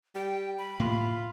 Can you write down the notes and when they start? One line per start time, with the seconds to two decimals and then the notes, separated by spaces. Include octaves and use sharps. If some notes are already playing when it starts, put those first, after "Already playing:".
0.15 G3 G5
0.58 B5
0.80 A2 A#3 F4